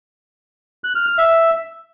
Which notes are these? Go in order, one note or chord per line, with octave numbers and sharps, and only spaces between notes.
F#6
F6
F6
E5